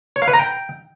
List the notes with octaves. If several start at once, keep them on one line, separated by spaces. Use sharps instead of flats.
C#5
F5
B4
A#5
G5